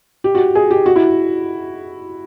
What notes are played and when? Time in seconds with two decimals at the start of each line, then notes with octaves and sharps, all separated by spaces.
0.24 G4
0.35 F#4
0.55 G#4
0.71 G4
0.86 F#4
0.96 E4